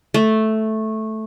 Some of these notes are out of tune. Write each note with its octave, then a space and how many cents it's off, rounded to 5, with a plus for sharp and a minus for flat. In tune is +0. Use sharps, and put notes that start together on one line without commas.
A3 -5